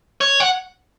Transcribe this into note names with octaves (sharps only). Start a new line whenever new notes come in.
C#5
F#5